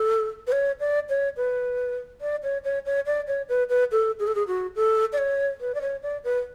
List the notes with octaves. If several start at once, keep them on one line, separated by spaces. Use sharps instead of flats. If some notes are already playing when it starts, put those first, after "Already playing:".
Already playing: A4
B4
C#5
D5
C#5
B4
D5
C#5
C#5
C#5
D5
C#5
B4
B4
A4
G#4
A4
G#4
F#4
A4
D5
C#5
B4
D5
C#5
D5
B4